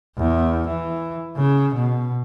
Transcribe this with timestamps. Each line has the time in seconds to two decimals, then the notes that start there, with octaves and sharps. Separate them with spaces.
0.18 E2
0.68 E3
1.36 C#3
1.74 B2